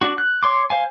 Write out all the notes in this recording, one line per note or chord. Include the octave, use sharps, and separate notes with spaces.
D4 F#4
F#6
C#5 C6 D6
C5 F5 G#5